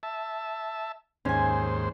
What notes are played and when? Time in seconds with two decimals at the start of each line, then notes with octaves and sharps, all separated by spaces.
0.03 E5 A5
1.25 D#2 G#2 C#4 C5 G#5